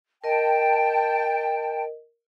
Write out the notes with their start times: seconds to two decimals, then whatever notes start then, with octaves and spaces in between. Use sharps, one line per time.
0.24 A#4 D#5 G5 A5